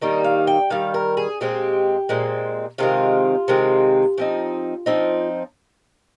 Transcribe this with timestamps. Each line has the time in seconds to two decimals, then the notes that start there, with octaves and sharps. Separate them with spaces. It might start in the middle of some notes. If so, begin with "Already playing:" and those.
0.01 D#3 G3 A#3 D#4 D#5
0.24 F5
0.47 G5
0.70 D#3 G3 F5
0.94 A#4
1.17 G#4
1.41 A#2 G#3 C4 G4
2.09 A#2 G#3 C4
2.78 C3 D#3 G#3 C4 F4
3.48 C3 D#3 G#3 C4
4.18 F3 C4 D#4
4.86 F3 C4 D#4